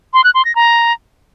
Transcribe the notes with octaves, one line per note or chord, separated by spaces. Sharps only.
C6
F#6
C6
A#6
A#5